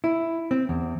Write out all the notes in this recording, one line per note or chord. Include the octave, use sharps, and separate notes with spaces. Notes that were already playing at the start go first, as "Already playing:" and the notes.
E4
C4
E2